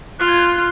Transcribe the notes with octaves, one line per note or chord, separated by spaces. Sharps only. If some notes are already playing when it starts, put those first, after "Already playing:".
F4 F#6
G#6
F#6